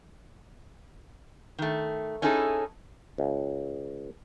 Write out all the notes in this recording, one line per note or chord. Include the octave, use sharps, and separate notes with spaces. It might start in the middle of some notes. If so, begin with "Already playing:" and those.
D#3 A3
C#4 D#4 E4 G#4 A4
C#2